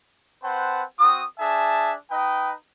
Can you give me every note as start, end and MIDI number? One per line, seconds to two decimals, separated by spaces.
0.43 0.83 60
0.43 0.83 71
0.43 0.83 72
0.43 0.83 78
0.43 0.83 81
0.99 1.23 60
0.99 1.23 66
0.99 1.23 87
1.39 1.93 62
1.39 1.93 68
1.39 1.93 76
1.39 1.93 81
2.10 2.52 63
2.10 2.52 71
2.10 2.52 75
2.10 2.52 79